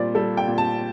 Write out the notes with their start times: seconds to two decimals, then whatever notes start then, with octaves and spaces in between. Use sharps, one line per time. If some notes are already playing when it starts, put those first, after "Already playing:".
Already playing: A#2 G3 C5 D5
0.15 G3 A4
0.37 G5
0.48 A#2
0.58 A5